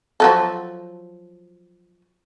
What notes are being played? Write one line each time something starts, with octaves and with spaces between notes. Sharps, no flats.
F3 F#3 A4